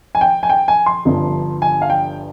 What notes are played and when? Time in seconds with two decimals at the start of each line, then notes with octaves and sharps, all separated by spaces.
0.15 G#5
0.21 G5
0.43 G#5
0.49 G5
0.68 G#5
0.86 C6
1.05 G1 G2 F3
1.62 G#5
1.82 F5
1.90 G5